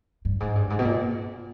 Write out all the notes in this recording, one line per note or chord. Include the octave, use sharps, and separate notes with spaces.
G2
G#2
G2
G#2
B2
A#2